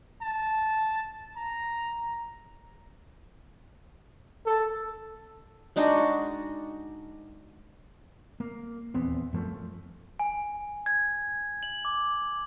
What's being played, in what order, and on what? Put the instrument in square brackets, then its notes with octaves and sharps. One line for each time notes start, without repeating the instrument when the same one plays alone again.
[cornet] A5
A#5
A4
[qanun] G#3 D4 D#4 F#4
[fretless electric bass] A#3
D#1 E2 B3 C4
F#2 F3 A3
[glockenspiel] G#5
G#6
F#7
D6